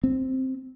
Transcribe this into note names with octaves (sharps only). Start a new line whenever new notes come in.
C4